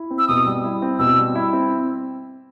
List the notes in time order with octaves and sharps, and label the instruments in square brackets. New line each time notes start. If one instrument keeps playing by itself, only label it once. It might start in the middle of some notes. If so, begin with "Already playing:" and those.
Already playing: [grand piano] E4
C4
[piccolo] E6
[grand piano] B2 [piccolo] D#6
[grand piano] G3
E4
C4
[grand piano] B2 [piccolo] E6
[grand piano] G3
E4
C4